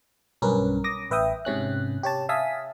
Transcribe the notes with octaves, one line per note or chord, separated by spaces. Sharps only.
B1 G2 C#4 A#4 B4
D6 D#6 A#6
A1 B4 E5 G5 D#6
G#2 C3 C#4 F#6
G4 C#5 A5
E5 F5 G#5 A5 D#6 B6